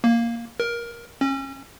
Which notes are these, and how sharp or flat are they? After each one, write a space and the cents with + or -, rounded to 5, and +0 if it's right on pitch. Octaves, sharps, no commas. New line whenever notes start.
A#3 +0
A#4 +15
C#4 -30